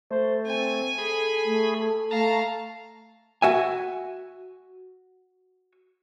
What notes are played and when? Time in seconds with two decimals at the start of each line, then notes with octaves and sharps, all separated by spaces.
0.11 A3 C5
0.47 C4 G#5
0.98 G#4 A4 B5
1.45 A3
2.11 A3 F5 A5 A#5
3.42 F#4 E5 G#5